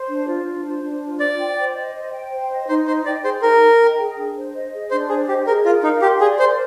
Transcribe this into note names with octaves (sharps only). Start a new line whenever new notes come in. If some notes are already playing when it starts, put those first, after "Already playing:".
Already playing: C5
D4
F4
D4
C5
D4
F4
C5 D5
G5
C5
D#5
C5
G5
C5
D#5
D#4 C5
C5 D#5
D5 G5
G#4 C5
D#4 A#4
D#5
G5
G#4
D4
C5
D#5
G#4
D4 C5
G#4 C5
G4 D#5
G#4 A#4
F4 A#4
D#4 F5
G4 C6
G#4 D5
A#4 C5